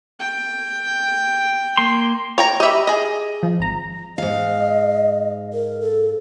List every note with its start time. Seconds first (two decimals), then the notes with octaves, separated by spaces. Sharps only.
0.20 G5
1.77 A#3 C6
2.38 C#5 G5 A#5
2.60 G4 D#5 E5 B5
2.87 G#4 D#5
3.43 F3
3.59 G#1 A#5
4.18 G#2 D#5 F5
5.53 A#4
5.81 A4